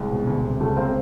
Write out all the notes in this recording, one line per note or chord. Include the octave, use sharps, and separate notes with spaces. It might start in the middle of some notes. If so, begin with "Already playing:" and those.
Already playing: C2 G#3
B2
D2
C3
C#2 G3 A3
C#3 A#3 C4